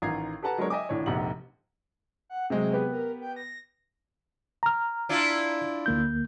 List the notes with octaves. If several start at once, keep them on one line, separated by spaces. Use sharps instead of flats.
A1 D#3 F4 A#5 G#6 C7
G4 A4 B4 F#5 A5 A#5
F#3 G#3 B3 D4 A#4 C#5
D#5 E5 G5 G#5 D6
D#1 A2 D4 C#5
F1 A#1 G#2 G4 F#5 F#7
F#5
C3 F#3 G#3 G#4
B3 G4 B4
A#4
G5
A#6
A#5 F6
D4 E4 F4
D2 A#3 G6